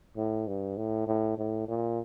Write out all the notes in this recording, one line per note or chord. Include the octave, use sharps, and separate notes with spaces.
A2
G2
A2
A2
A2
A#2